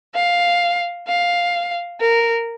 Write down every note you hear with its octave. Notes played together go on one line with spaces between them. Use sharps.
F5
F5
A#4